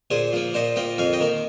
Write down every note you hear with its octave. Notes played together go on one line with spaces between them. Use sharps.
A#2 G#4 C5
F3 A#3
A#2 C5 D#5
F3 A#3 D#5 G5
F2 F5 G#5
D#5 G5
D#3 A#3